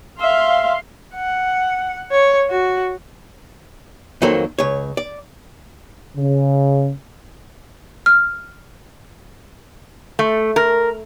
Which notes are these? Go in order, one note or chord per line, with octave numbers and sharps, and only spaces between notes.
E5 F5 C6
F#5
C#5
F#4
F2 D#3 F#3 A#3 A4 C5
C#2 C#5
D5
C#3
F6
A3
A#4